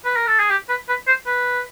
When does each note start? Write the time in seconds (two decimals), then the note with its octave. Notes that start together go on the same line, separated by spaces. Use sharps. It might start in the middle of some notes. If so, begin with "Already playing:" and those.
0.05 B4
0.16 A#4
0.27 A4
0.39 G#4
0.50 G4
0.69 B4
0.89 B4
1.07 C5
1.27 B4